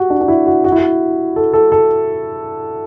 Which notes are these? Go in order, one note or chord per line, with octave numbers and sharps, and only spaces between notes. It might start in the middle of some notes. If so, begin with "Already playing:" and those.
Already playing: F#4 G4
D4
D4
E4
F#4
F#4
E4
F#4
A4
A4
A4